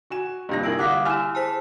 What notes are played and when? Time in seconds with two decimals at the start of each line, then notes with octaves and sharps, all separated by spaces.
0.10 F#4 G#5 E7
0.49 G2 C3 A#3 F4 A#6
0.63 E4 G#4 A#4 E6 A#6 D7 F#7
0.79 D3 G3 F5 F#5 D6 D#6 F#6 B6
1.05 E4 G4 G#5 E6 F6 E7
1.35 G#4 C5 G#5 A5 E6 B6